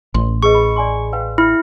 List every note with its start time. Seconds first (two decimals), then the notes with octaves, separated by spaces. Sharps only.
0.14 A1 C6
0.43 G#4 B4 D#5 C#6
0.55 B5
0.76 D5 G#5 C6
1.13 B4 F5 G5
1.38 E4